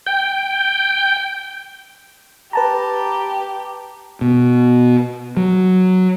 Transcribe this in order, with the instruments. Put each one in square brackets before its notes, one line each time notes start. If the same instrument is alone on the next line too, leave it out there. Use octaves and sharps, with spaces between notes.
[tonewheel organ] G5
[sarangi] G4 [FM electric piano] B4 A5 A#5
[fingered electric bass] B2
F#3